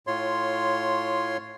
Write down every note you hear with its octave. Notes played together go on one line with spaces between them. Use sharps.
A2 F4 C#5 C6